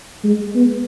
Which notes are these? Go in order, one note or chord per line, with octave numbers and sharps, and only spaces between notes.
G#3
B3